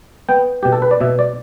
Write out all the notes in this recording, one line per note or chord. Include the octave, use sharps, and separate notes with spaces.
B3 G5
B2 G4
A4
B4
D5
B2 E5
D5